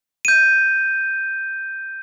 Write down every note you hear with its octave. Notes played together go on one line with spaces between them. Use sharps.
G6 D#7